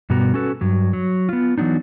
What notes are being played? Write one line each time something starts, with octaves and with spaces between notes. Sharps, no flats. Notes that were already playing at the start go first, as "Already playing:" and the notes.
G2 B2 G3 B3 F#4 A#5
C#4 F#4 A4 B4
G2 F#3
F#3
B3 F4
E3 F#3 B3 D4 D#4